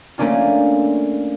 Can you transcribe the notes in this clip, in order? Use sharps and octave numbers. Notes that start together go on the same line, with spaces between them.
A3 A#3 C#4 D4 F4